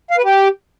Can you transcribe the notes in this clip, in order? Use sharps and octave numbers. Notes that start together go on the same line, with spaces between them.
F5
B4
G4